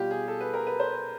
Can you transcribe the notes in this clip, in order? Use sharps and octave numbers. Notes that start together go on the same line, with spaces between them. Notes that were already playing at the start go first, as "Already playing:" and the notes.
Already playing: B2 G3 F4 G4
G#4
A4
B4
A#4
B4
C5